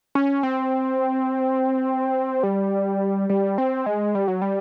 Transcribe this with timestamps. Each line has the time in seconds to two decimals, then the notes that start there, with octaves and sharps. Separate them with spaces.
0.15 C#4
0.43 C4
2.43 G3
3.30 G3
3.58 C4
3.86 G#3
4.15 G3
4.28 F#3
4.42 G3